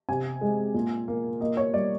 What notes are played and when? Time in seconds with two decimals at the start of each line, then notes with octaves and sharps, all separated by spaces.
0.09 C3 G#5
0.41 G#3
0.74 A#2
1.08 A#3
1.41 A#3 D#5
1.57 C#5
1.73 G3 D5